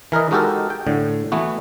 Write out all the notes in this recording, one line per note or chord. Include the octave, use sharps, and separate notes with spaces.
E3 A#4 B4 D#5
G#3 D#4 F#4 G4 A4 A#4
G5
A2 D3
E3 A3 B3 F#4